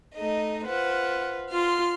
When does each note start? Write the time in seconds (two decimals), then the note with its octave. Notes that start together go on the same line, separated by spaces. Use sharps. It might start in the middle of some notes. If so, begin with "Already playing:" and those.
0.15 A3 D#4 D#5
0.66 F4 B4 C5 F#5
1.52 F4 C6 F6